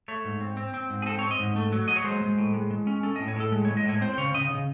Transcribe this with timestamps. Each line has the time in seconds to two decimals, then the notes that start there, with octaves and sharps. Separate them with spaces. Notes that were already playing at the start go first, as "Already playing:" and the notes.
0.08 A3 C#5
0.25 G#2
0.41 C4
0.57 C4
0.74 C4
0.90 G#2
1.02 G#4
1.06 C4 A4
1.19 C#5
1.23 C4
1.31 D#5
1.39 G#2
1.56 A3
1.72 F#3
1.88 F#3 D#5
1.96 C#5
2.04 G#3 C5
2.21 G#3
2.38 A2
2.54 G#3
2.71 G#3
2.87 C#4
3.03 C#4 A4
3.16 D#5
3.20 A2
3.28 C#5
3.36 A2 A4
3.52 G#3
3.65 G#3 C#5
3.77 D#5
3.85 A2 C#5
4.01 C4 C5
4.14 C5
4.18 C#3 C#5
4.34 C#3 D#5
4.51 C#3